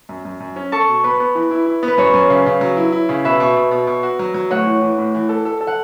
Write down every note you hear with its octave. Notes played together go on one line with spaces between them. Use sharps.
F#2
F#2
F#2
C#4
A4 A5 C#6
B2
B3 B4
B3
E3
E4
E4
B3
B4
F#2 C#5
F#2
C#3
C#3
F#3
E4
E4
C#3
B2 B4 E5
B2
B2
B2
B2
F#4
F#3
F#3
A2 C#5 F#5
E3
E3
A2
E3
A4
A4
A4
F#5